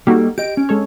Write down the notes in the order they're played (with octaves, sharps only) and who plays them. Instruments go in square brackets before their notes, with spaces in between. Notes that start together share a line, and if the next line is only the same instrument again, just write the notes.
[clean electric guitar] G3 A#3 A4 [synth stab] D#4 F#4 G4
[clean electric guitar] G4 D#5 [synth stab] D7
[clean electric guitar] C#4
[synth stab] G#3 A4 C#5